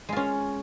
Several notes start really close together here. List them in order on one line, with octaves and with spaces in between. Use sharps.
G#3 F4 C#4